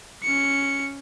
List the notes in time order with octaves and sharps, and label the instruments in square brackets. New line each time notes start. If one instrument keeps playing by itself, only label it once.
[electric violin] C#4 C#7